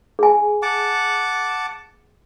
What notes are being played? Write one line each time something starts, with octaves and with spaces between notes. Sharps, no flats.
G#4 G#5
F#5 A5 D6